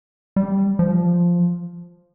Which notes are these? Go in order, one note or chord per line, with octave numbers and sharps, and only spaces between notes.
G3
F3